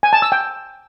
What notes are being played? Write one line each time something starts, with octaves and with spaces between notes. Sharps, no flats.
G#5
A5
E6
G5